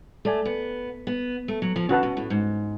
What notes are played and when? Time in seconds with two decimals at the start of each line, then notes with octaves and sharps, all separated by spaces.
0.25 A3 A4 D5 G#5
0.45 B3
1.07 B3
1.48 A3
1.62 F#3
1.76 F3
1.89 D3 C#4 F#4 B4 F#5 A5
2.03 B2
2.17 A2
2.30 G#2